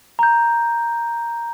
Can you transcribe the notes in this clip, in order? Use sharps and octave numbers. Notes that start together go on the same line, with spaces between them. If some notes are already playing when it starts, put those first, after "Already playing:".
A#5 G6